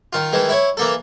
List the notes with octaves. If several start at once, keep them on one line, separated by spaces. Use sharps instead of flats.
D#3 F4
D#3 E3 G#3
E4 C#5
E3 A#3 A4